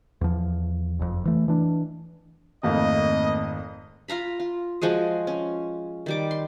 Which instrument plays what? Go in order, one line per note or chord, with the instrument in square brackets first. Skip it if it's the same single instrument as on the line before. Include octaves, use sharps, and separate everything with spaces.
[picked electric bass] E2 F3
F#1 F2
E3 A3
E3 D4
[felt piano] G#1 F2 F5 [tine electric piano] A3 A#3 C4 [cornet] D#5
[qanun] F4 F5 A#5 B5
F4
F3 G#3 F#4 G#4
C#4
D#3 G3 D6
C6